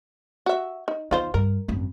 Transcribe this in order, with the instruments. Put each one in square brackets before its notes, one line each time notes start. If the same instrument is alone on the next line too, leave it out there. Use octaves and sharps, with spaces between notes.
[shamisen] F#4 E5
D#4
[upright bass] E2 [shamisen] D#4 F4 C5
[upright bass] G2 [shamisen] A#4
[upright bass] G#1 F#2